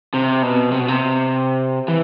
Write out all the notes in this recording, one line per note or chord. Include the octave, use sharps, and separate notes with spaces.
C3
B2
C3
B2
C3
E3